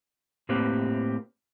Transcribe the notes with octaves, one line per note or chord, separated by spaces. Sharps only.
A2 A#3 C4 G4 B4